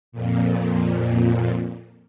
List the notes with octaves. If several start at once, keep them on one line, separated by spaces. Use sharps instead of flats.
F2 A#2